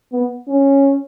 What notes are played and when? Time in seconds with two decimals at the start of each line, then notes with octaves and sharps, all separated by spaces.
0.12 B3
0.48 C#4